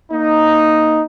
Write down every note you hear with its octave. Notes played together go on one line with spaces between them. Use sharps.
A#3 D#4